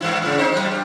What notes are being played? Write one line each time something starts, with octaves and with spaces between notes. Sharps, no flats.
G2 E3 E4
G#2 C#3
C4 D#4 C5
F#3 G3
G2 G4